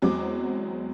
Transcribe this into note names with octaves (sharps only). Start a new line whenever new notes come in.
E2 F#3 G#3 C4 D6